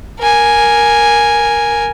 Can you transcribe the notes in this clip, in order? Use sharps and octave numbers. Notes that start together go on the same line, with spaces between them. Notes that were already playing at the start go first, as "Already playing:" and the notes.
A#4 G#5